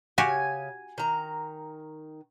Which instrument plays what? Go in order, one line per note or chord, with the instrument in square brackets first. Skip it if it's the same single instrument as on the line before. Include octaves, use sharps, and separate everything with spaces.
[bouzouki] C#3 [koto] F#4 G4 [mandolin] G#5
[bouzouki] D#3 A#5